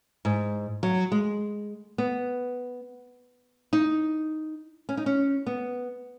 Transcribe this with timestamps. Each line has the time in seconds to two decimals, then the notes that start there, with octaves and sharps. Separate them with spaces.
0.25 G#2
0.83 F#3
1.12 G#3
1.98 B3
3.73 D#4
4.89 C#4
4.97 D#4
5.06 C#4
5.47 B3